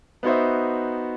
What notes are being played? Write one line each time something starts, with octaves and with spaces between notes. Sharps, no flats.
B3 D#4 F#4 C5 E5